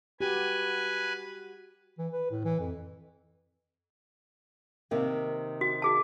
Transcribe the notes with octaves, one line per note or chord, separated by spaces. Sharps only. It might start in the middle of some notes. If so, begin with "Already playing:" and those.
F#4 G4 B4 G#5
E3
B4
A2
E3
F2
C3 D#3 A#3
F#4
F#4 G#4 A5